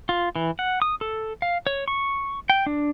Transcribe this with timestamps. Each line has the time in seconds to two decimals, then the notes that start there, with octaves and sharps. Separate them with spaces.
0.09 F4
0.36 E3
0.59 F#5
0.82 D#6
1.01 A4
1.42 F5
1.67 C#5
1.88 C#6
2.50 G5
2.67 D4